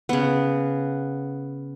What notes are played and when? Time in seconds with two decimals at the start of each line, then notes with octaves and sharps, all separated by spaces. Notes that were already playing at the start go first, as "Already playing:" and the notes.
0.09 C#3 B3